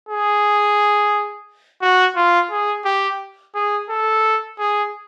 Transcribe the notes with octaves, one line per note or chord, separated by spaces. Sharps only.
G#4
F#4
F4
G#4
G4
G#4
A4
G#4